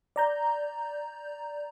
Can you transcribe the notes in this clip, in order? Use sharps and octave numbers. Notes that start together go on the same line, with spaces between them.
D5 A#5 G6